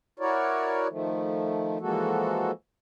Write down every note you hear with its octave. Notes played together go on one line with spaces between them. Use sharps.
E4 F#4 A#4 C#5 D5
D#3 F3 A3
E3 F3 G#3 A#3 F#4 A4